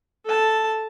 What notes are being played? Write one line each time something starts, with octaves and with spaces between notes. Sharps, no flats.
A4 A5